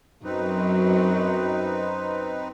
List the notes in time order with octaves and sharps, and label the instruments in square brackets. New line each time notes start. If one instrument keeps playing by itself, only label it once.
[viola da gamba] F#2 F#3 [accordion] C4 D#4 B4